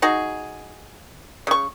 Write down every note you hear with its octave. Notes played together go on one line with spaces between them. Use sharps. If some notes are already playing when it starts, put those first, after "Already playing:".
D#4 F#4 G#4
C#3 C#6